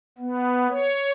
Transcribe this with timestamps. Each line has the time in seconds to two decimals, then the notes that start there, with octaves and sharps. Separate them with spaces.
0.18 B3
0.69 C#5